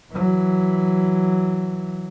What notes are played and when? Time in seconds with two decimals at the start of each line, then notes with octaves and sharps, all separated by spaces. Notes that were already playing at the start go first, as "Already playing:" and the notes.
0.12 E3 F#3